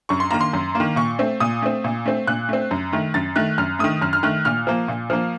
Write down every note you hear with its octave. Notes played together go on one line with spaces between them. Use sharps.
F#2 C#6
C6
D#3 A#3 A#5
C6
F#2
A#3
D#3
A#2 C#6
A3 C4
A#2 D#6
A3 C4
A#2
A3 C4
A#2 F#6
A3 C4
F#2
D#3 A3
F#2 A6
D#3 A3 F#6
F#2 F6
D#3 A3 D#6
F#2 F6
F6
D#3 A3 F#6
A#2 F6
F3 A#3
A#2
F3 A#3